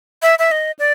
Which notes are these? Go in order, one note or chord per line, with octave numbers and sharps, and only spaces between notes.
E5
E5
D#5
D5